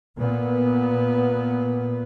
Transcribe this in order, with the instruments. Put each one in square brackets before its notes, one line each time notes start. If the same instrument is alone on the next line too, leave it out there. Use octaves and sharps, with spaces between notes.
[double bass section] A#2 B3